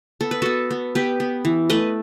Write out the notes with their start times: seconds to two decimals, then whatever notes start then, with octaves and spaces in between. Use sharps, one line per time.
0.21 B3 A4
0.31 B4
0.42 B3 F#4 A4
0.71 B3
0.95 B3 G4 B4
1.20 B3
1.45 E3
1.70 A3 B4 D#5